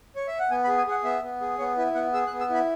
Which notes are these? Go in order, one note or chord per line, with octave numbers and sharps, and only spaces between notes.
C#5
E5
F#5
B3 G#5
B5
G#4
G#5
G#4 F#5
B3 E5
B3
G#4
B3 C#5
E4 B4
B3 F#5
G#4 E6
F#6
B3
E6
E4 B5